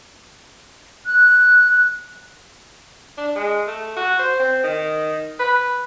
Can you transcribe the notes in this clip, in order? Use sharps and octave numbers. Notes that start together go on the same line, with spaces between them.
F#6
D4
G#3
A3
F#4
C5
C4
D#3
B4